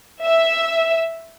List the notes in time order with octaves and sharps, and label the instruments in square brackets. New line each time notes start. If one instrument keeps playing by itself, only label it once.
[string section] E5